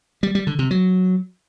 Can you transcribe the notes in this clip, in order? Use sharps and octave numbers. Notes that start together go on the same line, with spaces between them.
G3
G3
D3
C3
F#3